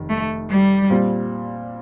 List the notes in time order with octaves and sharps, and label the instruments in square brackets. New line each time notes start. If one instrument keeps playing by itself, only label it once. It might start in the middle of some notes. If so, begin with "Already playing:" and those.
Already playing: [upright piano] F1 D#3
[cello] A3
G3
[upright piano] A#2 G3 C4